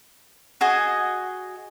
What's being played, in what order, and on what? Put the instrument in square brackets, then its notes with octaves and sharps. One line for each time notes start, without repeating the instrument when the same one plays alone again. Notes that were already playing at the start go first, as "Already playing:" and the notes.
[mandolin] F#4 G#4 D#5